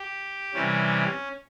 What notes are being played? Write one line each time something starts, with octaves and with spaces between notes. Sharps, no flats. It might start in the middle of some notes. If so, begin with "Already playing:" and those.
Already playing: G4
C3 E3 G3 C#4